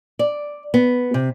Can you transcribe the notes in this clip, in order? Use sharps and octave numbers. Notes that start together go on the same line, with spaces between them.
D5
B3
C3